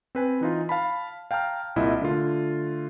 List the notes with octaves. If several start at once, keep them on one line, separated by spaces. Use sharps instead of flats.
C4 B4 G#5
E3 D#4 F4
F5 A5 B5
F5 G5 A5 A#5 F6
C2 A#2 E4 D#5 E5
D3 A3 F4